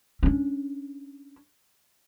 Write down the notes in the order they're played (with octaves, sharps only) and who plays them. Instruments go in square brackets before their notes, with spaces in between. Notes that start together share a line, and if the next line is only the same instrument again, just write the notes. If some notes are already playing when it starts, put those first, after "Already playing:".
[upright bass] C#4 D4